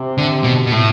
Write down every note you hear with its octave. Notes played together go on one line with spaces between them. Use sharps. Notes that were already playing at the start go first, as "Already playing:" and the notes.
Already playing: C3
D3
B2
B2
A2